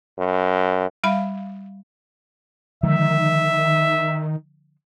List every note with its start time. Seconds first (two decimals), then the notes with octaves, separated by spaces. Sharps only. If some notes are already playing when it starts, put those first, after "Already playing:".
0.18 F#2
1.04 G3 E5 F5 B5
2.83 D3 D#3 F3 G#3 E5